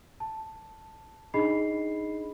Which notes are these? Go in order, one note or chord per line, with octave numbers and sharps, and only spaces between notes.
A5
D4 D#4 G#4 D#5 B5 C7